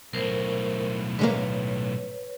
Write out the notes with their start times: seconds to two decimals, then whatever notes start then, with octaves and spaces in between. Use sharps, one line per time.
0.13 B1 A2 A#4 C5
1.19 D3 G#3 A#3 B4 C#5